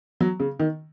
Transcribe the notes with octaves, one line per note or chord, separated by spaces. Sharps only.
F#3
C#3
D#3